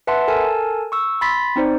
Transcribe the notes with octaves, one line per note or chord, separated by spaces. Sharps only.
B4 E5 F#5 A5 C6
A4 A#4 G#5 A5
C#6 E6
B5 C6 A6 B6
C4 D#4 C5 D5